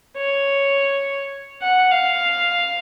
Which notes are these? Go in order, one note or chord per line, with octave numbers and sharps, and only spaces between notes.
C#5
F#5
F5